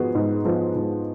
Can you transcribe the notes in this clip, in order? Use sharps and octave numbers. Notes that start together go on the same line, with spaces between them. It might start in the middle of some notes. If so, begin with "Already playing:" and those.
Already playing: G#2 F3 B3 F#4 G#4
G#2
F3 B3
G#2